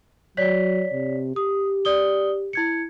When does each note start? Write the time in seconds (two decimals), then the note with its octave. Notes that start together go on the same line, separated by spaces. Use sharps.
0.37 F#3 C#5 D5 B6
0.92 C3
1.36 G4 D#6
1.85 D5 D#6 G7
2.53 E4 G#6 C#7